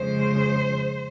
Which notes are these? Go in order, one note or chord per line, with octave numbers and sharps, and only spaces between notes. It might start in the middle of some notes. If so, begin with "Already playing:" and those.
Already playing: F2 C#3 F3 G#3 C5